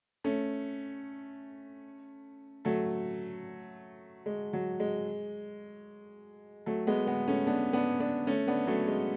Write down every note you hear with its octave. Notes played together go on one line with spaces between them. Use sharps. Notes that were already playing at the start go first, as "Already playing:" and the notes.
A3 C#4
F#3 A3
G#3
F#3
G#3
F#3 A3
G#3 B3
G#3 B3
A3 C#4
B3 D4
B3 D4
B3 D4
A3 C#4
B3 D4
F#3 A3
G#3